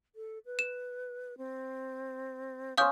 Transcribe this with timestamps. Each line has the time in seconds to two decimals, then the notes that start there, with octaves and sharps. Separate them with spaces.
0.16 A4
0.46 B4
0.59 E7
1.38 C4
2.78 B3 C#4 C5 F5 D#6 G6